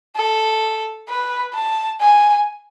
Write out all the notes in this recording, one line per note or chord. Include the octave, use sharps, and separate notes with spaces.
A4
B4
A5
G#5